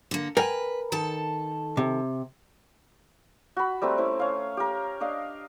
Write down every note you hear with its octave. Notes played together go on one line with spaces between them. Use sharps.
D3 A#3
A#4 B4 G5 G#5
D#3 A4 A5
C3
F#4 B5
G3 A3 C4 A#5
C4 C#4 E4
C#4 F5
G4 A#4
D4 D#5 F5